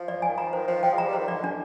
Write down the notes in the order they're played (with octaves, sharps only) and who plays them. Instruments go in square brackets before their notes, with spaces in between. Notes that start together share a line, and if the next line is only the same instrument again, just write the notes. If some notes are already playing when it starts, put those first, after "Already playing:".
Already playing: [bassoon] F3
[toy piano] D5
G#5
[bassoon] D#3
[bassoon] F3 [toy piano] A#5
[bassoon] D#3 [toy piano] C5
[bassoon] F3 [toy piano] C5
[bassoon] F3 [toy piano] G5
[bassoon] G#3 [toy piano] A#5
[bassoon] G3
[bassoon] D#3 [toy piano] C5
[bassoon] D3 [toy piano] D5
[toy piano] D4